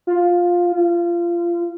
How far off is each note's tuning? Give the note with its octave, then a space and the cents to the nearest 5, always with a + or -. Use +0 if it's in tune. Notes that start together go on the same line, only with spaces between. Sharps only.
F4 +10
F4 -25